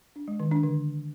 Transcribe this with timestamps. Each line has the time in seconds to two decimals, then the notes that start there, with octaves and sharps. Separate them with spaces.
0.16 D4
0.28 G#3
0.40 D#3
0.51 D4
0.63 D3